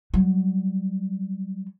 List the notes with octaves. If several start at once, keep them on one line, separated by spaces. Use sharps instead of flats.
F#3 G3